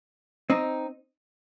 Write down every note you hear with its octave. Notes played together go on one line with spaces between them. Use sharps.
C4 D#4